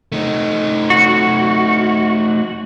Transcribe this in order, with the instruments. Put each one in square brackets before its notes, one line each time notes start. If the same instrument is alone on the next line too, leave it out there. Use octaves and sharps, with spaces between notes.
[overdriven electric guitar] A3 D#4
[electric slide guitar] F#4